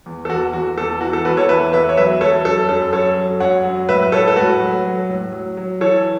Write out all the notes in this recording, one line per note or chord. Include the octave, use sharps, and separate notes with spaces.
E2
A4
E2 F#4
E2 F#4
E2 A4
E3 F#4
A4
E2 F#4 B4
A4 C#5
E2 B4 E5
E2 B4 E5
C#5
F#3 B4 E5
F#3 A4 C#5
F#2 A4
F#2 A4
F#3 A4 C#5
F#3
F#2 C#5 F#5
F#3
A2 B4 E5
B4
A2 A4 C#5
A4
A2 F#4 B4
F#3
F#3
A2
F#3
F#3
E3 A4 C#5